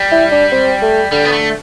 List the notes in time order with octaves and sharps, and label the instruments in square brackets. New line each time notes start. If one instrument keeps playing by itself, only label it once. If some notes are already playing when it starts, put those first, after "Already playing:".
Already playing: [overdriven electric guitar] G3
[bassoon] E4
D4
C4
A3
[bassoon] D3 [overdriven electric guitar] G3
[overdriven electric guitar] B3
A3